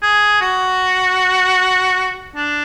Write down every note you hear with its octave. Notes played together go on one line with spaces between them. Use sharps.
G#4
F#4
D4